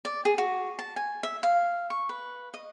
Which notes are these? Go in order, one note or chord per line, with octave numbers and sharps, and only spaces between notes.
D5
G#4
F#4
A5
G#5
E5
F5
C#6
B4
D#5